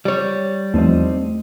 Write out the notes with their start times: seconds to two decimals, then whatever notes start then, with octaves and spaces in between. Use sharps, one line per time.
0.05 G3 C#5
0.74 E2 F3 A3 C4 D#4